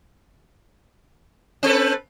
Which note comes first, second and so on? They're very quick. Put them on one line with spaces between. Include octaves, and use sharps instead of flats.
C4 A4 B4